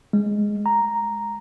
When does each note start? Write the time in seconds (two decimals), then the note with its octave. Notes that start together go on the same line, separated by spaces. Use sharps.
0.13 G#3
0.66 A#5